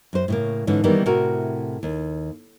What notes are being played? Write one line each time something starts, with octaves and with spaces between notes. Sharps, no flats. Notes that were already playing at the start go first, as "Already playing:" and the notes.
F#2 C5
A2 C#3 A#3
G#2 D3 E3 C#4
D#3 E3 G3 A#3 B3 D#4
A2 C3 E4 F#4 A#4
D#2